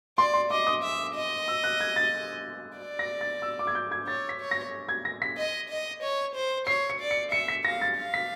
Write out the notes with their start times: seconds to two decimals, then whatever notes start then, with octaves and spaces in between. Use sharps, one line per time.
0.18 D5 C6
0.34 C6
0.50 D#5 D6
0.67 D#6
0.83 E5
1.15 D#5
1.48 E6
1.63 F#6
1.80 G#6
1.96 A6
2.78 D5
2.99 A#6
3.21 A6
3.42 E6
3.59 D6
3.67 G#6
3.75 G6
3.91 G#6
4.07 C#5 A6
4.29 B6
4.41 C#5
4.51 A#6
4.89 G#6
5.05 A#6
5.22 B6
5.37 D#5
5.69 D#5
6.03 C#5
6.35 C5
6.67 C#5 C7
6.90 C#7
7.00 D5
7.11 C#7
7.32 E5 C#7
7.48 B6
7.65 F5 A#6
7.81 A6
7.97 F5
8.14 B6